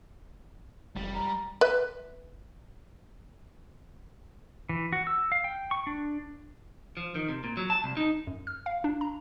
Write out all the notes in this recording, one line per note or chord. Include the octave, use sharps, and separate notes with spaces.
F1 G3
A#5
B4 E5
E3
F#4
E6
F5
G5
C#6
D4
F3
D#3
C3
A#2
F#3
A5
C2
D#4
F#2
F6
F5
D4
A#5